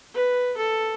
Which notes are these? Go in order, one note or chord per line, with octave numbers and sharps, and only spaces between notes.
B4
A4